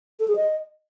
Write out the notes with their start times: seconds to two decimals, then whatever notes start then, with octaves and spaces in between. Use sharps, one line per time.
0.20 A4
0.28 G#4
0.36 D#5